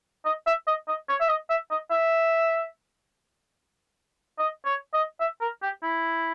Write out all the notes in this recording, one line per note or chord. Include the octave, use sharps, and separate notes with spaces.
D#5
E5
D#5
D#5
C#5
E5
D#5
E5
D#5
E5
D#5
C#5
D#5
E5
A#4
G4
E4